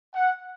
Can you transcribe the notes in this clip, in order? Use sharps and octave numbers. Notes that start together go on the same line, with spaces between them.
F#5